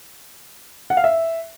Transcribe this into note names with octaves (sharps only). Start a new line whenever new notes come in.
F#5
F5
E5